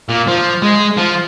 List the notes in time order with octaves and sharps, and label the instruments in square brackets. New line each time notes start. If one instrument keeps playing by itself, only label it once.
[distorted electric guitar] A#2
F3
G#3
F3